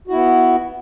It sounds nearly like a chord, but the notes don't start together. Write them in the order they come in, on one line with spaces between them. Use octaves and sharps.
F#4 E4 B3